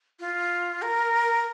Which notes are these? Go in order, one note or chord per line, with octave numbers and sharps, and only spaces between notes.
F4
A#4